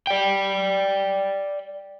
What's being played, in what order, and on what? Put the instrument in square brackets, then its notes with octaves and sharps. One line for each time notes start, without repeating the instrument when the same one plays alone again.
[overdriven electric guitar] D5 G5